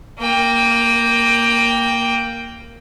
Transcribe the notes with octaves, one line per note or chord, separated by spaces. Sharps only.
A#3 G5